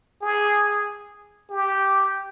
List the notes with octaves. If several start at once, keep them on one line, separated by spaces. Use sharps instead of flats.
G#4
G4